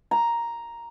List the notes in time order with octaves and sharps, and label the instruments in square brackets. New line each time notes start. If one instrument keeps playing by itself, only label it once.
[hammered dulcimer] A#5